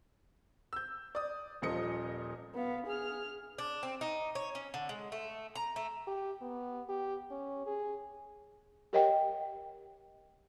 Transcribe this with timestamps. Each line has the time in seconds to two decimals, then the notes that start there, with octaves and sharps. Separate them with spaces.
0.73 E6 G6
1.15 D5 D#6
1.62 D#1 A#2 F3 D#5 D#6 C#7
2.55 B3 F5
2.87 G#4 F6
3.58 D4
3.83 C4
4.01 D#4
4.35 C#5
4.55 C#4
4.74 D3
4.89 G#3
5.12 A3
5.55 A#5
5.76 A3
6.07 G4
6.42 B3
6.89 G4
7.31 C#4
7.66 G#4
8.93 G4 A#4 C#5 D#5 F#5 G5